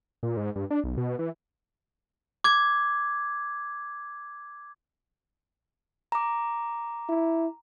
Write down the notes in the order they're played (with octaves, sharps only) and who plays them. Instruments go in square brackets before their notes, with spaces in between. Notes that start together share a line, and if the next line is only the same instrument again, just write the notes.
[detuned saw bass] A#2
G#2
G2
D4
B1
B2
E3
[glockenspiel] D6 G#6
[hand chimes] A#5 D6
[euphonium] E4